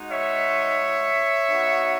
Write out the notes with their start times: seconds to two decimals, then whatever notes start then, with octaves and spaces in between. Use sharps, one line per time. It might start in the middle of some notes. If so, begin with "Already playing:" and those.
Already playing: G#3 D#4 F#4
0.11 C#5 E5
1.48 B3 D#4 F#4